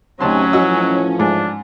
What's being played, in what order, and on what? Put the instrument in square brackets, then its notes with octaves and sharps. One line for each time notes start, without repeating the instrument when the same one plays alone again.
[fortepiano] D2 A5 C6 [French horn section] C3 C4 D#4 [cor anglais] F#3 [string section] C#4
[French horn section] A2 E3 F3 [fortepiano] F#4 D#5 E6
[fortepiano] G#2 [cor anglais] D4